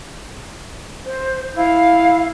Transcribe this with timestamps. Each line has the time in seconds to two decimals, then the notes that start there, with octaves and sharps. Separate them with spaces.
1.06 C5
1.57 E4 F5